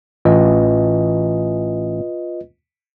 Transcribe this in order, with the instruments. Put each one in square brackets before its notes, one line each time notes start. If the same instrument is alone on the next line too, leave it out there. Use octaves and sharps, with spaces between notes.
[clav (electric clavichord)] A1 [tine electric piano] F4 B4 D#5